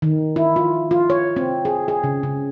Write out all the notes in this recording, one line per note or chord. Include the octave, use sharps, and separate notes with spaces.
D#3
E4
F4
F4
C#5
C4
G#4
G#4
C#3
C#3